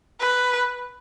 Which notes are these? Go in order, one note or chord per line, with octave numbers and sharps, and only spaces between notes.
B4